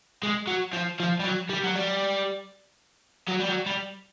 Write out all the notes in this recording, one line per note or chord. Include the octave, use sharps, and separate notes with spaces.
G#3
F#3
F3
F3
G3
F#3
G3
F#3
G3
F#3
G3
F#3
G3